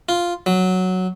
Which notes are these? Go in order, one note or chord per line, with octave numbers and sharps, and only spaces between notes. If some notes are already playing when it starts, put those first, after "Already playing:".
F4
F#3